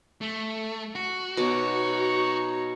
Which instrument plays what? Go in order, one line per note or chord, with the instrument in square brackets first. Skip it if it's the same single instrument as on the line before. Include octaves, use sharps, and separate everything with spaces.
[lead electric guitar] A3
F#4
[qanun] B2 D6 [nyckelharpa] D#4 C#5